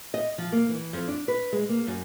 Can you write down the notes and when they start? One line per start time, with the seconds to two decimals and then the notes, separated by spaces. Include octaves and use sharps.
0.14 D#5
0.38 F3
0.52 A#3
0.69 E3
0.93 F2
1.08 D4
1.28 B4
1.53 G#3
1.69 A#3
1.87 F#2